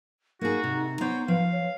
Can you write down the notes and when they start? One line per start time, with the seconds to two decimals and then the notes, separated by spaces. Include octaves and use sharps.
0.41 A#3 D#4 F#4 G#4
0.64 C3
1.01 B3 C5 C#5 G5
1.28 F3 B4 F5
1.52 C#5